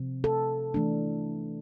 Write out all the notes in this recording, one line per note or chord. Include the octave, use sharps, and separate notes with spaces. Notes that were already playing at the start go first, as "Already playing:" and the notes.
Already playing: C3 F3 C4
A4
E3 A3 D4